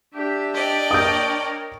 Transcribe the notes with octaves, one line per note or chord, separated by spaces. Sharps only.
D4 G4 E5
D5 D#5 G5
A#4 C#5 D#6 G6